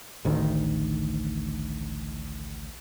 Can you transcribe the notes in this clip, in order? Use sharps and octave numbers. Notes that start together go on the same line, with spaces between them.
A1 D2 D#3